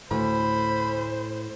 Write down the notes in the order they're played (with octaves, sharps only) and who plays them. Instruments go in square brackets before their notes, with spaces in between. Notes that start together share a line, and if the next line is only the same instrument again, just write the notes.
[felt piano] D2 [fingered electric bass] A2 [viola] C5 [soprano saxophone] B5